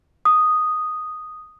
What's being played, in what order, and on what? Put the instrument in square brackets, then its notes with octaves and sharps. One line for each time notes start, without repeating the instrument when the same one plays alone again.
[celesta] D#6